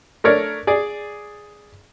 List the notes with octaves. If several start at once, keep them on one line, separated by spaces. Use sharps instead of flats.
A3 D4 A#4 C#5 D5
G#4 D5